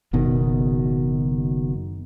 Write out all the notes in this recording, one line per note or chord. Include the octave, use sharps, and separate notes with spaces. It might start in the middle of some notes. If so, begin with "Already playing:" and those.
F#1 B2 D#3